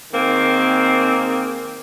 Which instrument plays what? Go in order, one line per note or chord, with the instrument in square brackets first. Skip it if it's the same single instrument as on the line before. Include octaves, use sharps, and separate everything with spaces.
[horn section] D#3 A#3 C4 G#4